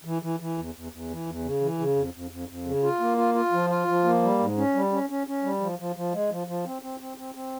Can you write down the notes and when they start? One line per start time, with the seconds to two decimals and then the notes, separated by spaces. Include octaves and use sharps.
0.05 E3
0.22 E3
0.40 E3
0.58 E2
0.75 E2
0.92 E2
1.10 E3
1.27 E2
1.44 C#3
1.61 E3
1.79 C#3
1.96 F2
2.14 F2
2.31 F2
2.49 F2
2.65 C#3
2.83 F4
3.00 A#3
3.17 F4
3.34 F4
3.52 F3
3.70 F4
3.88 F3
4.04 A#3
4.22 G3
4.39 G#2
4.57 C#4
4.75 G3
4.92 C#4
5.09 C#4
5.27 C#4
5.43 G3
5.60 F3
5.79 F3
5.96 F3
6.13 G#3
6.30 F3
6.47 F3
6.65 C4
6.82 C4
7.00 C4
7.17 C4
7.35 C4